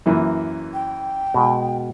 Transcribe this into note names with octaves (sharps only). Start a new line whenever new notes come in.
F#2 E3 A#3
G5
B2 G#3 A#4